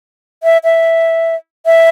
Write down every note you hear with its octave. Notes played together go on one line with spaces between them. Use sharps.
E5
E5
E5